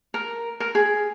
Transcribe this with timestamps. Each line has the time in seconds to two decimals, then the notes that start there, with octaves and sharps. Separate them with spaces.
0.14 A#4
0.60 A#4
0.75 G#4